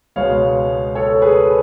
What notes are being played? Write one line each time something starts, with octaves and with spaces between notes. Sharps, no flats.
C#2 B2 G#3 C#5 F5
A4 C#5
G#4 B4